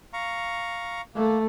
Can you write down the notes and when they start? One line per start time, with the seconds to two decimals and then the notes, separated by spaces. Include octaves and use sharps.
0.13 F5 A#5 C#6
1.15 A3 A#3